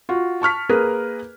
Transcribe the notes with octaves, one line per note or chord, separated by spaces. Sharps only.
F4 F#4
A5 C#6 F6 B6
A#3 G#4 A#4 B4